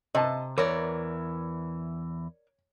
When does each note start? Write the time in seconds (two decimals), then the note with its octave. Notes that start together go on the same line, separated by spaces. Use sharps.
0.15 C3 D#5 A5
0.58 E2 E3 A#4 C#5 D5